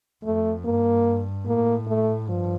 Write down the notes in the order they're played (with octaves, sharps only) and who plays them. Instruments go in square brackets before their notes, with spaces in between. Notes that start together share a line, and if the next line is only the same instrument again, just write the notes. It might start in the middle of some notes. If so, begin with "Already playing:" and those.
[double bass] F2 [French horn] A3
[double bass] G2 [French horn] A#3
[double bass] A2 [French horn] A#3
[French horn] A3
[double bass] G2 [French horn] F3